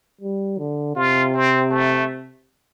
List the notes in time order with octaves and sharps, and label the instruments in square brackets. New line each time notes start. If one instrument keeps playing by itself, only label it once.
[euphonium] G3
D3
[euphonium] C3 [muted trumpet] F4
[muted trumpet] C4
A3